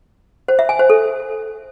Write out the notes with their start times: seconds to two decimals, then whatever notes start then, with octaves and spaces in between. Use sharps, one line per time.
0.48 C5
0.59 E5
0.69 G#5
0.79 C5
0.90 A4